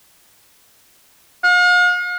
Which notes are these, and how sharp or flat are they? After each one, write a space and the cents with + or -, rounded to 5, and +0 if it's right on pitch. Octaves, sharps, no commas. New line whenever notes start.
F5 +45